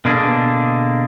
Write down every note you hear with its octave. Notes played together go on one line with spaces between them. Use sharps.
B2 D3 A#3 D4 G#4